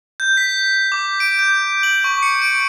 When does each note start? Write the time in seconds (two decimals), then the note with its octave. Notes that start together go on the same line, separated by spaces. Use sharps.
0.20 G6
0.37 B6
0.92 D6
1.20 D7
1.39 G6
1.83 F#7
2.04 C#6
2.22 C#7
2.42 D7